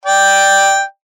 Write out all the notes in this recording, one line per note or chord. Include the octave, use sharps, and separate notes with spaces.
D5 G5